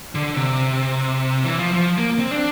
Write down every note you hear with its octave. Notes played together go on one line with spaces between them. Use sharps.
D3
C3
E3
F3
F3
A#3
C4
D4